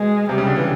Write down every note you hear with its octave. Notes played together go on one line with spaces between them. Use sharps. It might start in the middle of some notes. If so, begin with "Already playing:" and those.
Already playing: B2 G#3
C3 G3
C#3
D3
E3